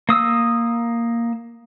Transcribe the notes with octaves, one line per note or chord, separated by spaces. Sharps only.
A#3 D#6 E6